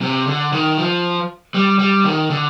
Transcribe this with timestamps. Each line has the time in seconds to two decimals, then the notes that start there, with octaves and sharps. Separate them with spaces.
0.01 C3
0.27 D3
0.53 D#3
0.78 F3
1.54 G3
1.79 G3
2.04 D#3
2.30 D3